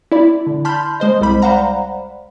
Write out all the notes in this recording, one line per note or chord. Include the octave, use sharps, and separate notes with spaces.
E4 D5 B5
D3
A5 B5 C6 F6 G6
G#3 C5 D#5
C2 G3 B5
C5 D5 F5 F#5 A#5 B5